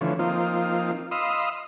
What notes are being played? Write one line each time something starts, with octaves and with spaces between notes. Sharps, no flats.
D3 E3 F3 A3 C#4
F3 A#3 C4 D#4 F4
D#5 F5 B5 C6 D#6 E6